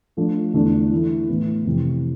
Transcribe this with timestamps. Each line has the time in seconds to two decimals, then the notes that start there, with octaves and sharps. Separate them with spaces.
0.17 F3 A3 D4
0.54 E2 D3 A3 D4
0.91 E3 A3 E4
1.28 A2 E3 B3
1.65 F2 C3 E3